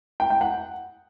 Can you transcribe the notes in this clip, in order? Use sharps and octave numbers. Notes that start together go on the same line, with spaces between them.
G5
G5
F#5